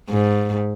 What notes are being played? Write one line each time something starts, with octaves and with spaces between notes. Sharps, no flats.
G#2